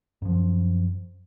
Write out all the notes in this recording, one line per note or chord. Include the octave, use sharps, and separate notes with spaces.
F#2 F3